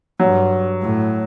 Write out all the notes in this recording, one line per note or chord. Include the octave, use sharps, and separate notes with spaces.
G2 F#3
A2